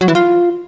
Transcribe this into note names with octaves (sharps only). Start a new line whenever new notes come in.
F#3
E3
F4